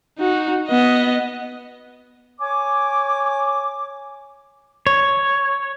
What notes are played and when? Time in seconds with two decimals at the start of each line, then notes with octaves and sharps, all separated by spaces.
0.19 D#4 F#4
0.68 B3 D#5
2.40 C#5 G#5 D6
4.87 C#5